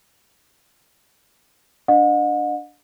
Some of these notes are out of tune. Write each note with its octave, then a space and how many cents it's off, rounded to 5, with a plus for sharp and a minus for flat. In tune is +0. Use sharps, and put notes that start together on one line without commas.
D4 +0 D#5 -25 F#5 -40